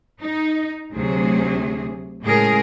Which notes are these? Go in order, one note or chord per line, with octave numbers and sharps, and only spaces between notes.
D#4
D2 C3 F#3 G#4
A2 C#3 G#3 G#4 A#4